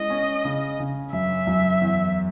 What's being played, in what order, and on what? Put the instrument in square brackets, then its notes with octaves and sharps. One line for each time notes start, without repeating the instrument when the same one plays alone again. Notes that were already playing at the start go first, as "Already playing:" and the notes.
Already playing: [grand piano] G#3 C#4 E4 [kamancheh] D#5
[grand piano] C#4
C#3
C#3
[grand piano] F#2 [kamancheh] E5
[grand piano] F#2
E2